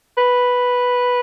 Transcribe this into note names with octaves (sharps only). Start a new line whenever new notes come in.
B4